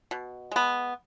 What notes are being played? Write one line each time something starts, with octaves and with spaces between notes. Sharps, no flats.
B2
G#3 B3